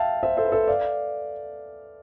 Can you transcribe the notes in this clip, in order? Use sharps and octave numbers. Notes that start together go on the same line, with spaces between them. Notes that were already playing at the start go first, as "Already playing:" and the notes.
Already playing: E5 F5 G5 A5
C5 E5
A4 C5
B4
A4 C5
D5 F5